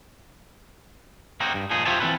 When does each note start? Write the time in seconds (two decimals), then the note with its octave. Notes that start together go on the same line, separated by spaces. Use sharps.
1.40 A#3 C4 D#4 F#4
1.54 G2
1.70 A#2 F3 D#4 G#4
1.85 F4 G4 C5 C#5 E5 A5
2.00 E3 C4 D#4 F4 A4 B4